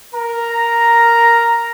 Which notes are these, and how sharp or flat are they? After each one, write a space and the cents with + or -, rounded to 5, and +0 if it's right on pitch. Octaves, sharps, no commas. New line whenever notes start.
A#4 +0 A#5 +0